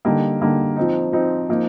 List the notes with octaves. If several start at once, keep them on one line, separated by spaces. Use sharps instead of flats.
D3 G3 A#3 D#4
D3 G3 A#3 D#4
F3 C4 D#4
F3 C4 D#4
F3 A#3 D#4